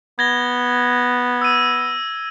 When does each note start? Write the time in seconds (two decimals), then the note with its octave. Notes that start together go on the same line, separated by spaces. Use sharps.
0.19 B3 G#6 A#6 G7
1.41 E6 D#7